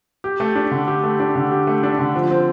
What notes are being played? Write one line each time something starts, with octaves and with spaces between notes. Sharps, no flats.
G4
A3
D4
D3
G4
A3
D4
D3
G4
A3
D4
D3
F3
C4